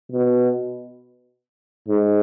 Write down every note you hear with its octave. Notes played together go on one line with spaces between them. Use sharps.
B2
G#2